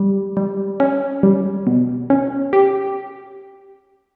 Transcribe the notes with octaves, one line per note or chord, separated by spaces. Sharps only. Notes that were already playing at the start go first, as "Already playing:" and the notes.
Already playing: G3
G3
C#4
G3
B2
C#4
G4